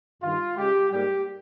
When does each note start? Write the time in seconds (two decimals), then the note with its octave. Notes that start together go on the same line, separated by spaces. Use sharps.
0.22 G2 D#3 G3 F4
0.57 C#3 G#3 G4
0.91 G#2 G3 A#3 G4